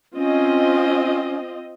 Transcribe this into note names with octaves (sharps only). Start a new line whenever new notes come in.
C4 C#4 F4 D#5